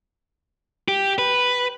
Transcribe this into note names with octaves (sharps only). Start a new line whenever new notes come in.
G4
B4